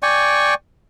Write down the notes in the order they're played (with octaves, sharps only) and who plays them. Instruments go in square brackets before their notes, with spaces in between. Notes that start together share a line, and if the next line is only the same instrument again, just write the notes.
[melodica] D5 G5 G#5 C#6